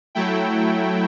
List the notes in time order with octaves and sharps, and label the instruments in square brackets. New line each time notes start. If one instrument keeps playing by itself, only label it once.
[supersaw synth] F#3 A3 E4 G5